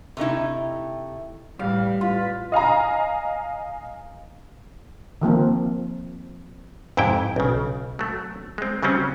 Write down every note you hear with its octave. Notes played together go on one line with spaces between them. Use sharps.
C3 A3 D#4 E4
A2 E3 G3 F5
A2 F4 B4
D#5 F5 G#5 A#5
D#3 F3 A#3 C4
F2 G#2 C3 E4 G5
B1 C#3
F#3 A3
G#3 C4
C#3 F#3 G3 C4 C#4